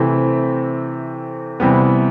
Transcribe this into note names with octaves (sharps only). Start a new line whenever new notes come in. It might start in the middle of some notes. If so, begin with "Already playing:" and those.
Already playing: C3 E3 A3 C4
C3 E3 G3 B3